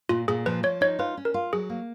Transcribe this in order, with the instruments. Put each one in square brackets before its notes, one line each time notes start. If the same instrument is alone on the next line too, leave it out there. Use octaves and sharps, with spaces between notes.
[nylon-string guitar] A#2 [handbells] F4
[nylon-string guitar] A#2 [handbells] G#4
[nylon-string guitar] F3 [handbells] B4
[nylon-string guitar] F3 [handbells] C#5
[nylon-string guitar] D#4 [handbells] C#5
[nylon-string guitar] F4 [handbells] B4
[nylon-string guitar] C#4
[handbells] A#4
[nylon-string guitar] F4
[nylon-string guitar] F#3 [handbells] G#4
[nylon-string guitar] A#3